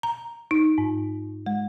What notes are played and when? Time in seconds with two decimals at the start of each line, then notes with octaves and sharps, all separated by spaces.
0.03 A#5
0.51 D#4
0.78 G#2
1.46 G#3